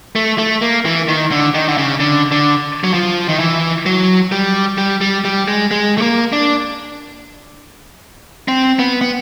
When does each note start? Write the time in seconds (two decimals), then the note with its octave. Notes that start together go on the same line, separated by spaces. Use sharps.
0.16 A3
0.38 A3
0.62 A#3
0.85 E3
1.08 D#3
1.31 D3
1.54 D#3
1.68 D3
1.78 C#3
2.00 D3
2.32 D3
2.84 F#3
2.94 F3
3.29 D#3
3.39 E3
3.86 F#3
4.32 G3
4.78 G3
5.01 G3
5.25 G3
5.48 G#3
5.71 G#3
5.98 A3
6.02 A#3
6.33 D4
8.48 C4
8.79 B3
9.01 B3